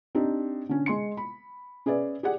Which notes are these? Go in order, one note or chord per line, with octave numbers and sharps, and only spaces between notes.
C4 D4 D#4 G4
D3 C#4
G#3 C6 C#7
B5
C#4 G#4 B4 D5 E5
G4 G#4 D5 F#5